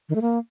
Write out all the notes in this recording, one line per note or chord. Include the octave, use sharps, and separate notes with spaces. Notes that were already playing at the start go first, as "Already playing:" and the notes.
D#3
A3
A#3